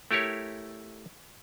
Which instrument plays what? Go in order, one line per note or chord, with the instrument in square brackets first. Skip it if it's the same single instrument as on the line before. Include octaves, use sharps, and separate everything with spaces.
[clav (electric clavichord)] A3 E4 G4 A#4 C#5